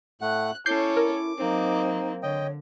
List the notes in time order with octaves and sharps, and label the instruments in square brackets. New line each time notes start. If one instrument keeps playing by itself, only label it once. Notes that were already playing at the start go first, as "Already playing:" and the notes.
[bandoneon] A2 A3 F#5 [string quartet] F#6
[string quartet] C#4 A4 C#5 [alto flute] E4 [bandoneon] D6 [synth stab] G6 C7
[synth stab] A#4
[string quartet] F#3 A#3 C4 [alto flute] D#4
[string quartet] D3 [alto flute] C#5 [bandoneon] D#5 G5